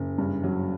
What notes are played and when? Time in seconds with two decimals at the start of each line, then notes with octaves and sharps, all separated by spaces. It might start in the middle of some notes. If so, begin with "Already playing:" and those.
Already playing: F#1
0.18 G2
0.44 F#3